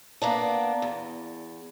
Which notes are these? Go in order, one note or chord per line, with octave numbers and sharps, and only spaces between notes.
A#3 B3 D4
E2